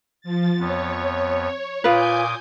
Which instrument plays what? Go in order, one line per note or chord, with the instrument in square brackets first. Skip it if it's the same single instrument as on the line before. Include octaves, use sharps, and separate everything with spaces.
[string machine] F3 A6
[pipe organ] F2 B3 [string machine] C#5
[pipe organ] A#2 D6 D#6 [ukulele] F4 B4 [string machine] G#5 G6